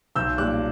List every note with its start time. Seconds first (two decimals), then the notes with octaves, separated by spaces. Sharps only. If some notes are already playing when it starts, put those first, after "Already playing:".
0.16 B1 E6 G6
0.38 A#2 G3 D6 F#6